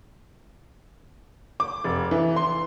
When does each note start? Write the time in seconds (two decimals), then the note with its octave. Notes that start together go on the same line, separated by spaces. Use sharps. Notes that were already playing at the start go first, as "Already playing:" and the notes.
1.60 D6
1.84 F1
2.11 E3
2.36 C6